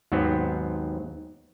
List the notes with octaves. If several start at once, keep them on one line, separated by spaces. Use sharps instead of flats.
D#2 G#2 F#3 B3 C4